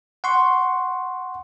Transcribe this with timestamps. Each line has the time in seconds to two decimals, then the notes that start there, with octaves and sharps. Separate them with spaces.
0.24 F#5 C6 C#6